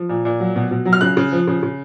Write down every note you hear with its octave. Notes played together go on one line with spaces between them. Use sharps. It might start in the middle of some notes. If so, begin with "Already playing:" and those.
Already playing: F3
A#2
A#2
F#3
B2
B2
F#3
F6
C#3 F#6
C#3
F3
C#3
C#3